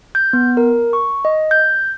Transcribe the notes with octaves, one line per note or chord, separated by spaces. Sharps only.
G6
B3
A#4
C#6
D#5
G6